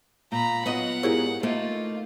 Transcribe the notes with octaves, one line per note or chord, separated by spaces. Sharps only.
A#2 A#5 B5
F#3 B3 F4 D#5 F#5
G#2 E4 G4 G#4 A#4 C#5
A3 A#3 D#4 F4